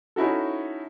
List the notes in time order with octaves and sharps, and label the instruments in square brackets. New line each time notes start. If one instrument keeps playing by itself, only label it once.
[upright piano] C#4 D#4 E4 F#4 A4